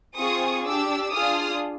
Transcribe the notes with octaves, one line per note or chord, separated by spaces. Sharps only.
C4 F4 G#4 C#6 D#6
D4 G4 D6 E6
D4 F4 G#4 D#6 F6